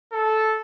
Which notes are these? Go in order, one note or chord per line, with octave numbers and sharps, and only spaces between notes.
A4